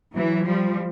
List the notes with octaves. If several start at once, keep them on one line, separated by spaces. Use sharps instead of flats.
E3 F#3
F3 G3